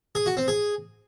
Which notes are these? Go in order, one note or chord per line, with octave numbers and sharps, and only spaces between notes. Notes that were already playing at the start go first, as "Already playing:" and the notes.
G#4
F#4
C4
G#4